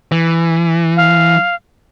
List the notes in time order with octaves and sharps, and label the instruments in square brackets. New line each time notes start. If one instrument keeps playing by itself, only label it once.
[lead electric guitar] E3
[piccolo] F5